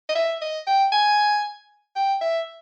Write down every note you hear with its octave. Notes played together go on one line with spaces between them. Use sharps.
D#5
E5
D#5
G5
G#5
G5
E5